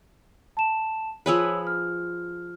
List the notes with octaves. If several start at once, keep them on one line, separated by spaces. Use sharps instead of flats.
A5 E7
F3 G#4 B4 C#5 E6
F6